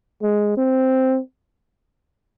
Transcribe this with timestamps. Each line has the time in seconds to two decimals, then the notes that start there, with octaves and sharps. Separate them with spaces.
0.22 G#3
0.57 C4